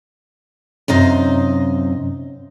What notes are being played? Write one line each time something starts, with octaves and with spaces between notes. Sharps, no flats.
F#2 C3 D#4 F5